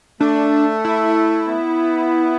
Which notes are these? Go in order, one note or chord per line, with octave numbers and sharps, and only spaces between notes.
A3 D4
E4
B3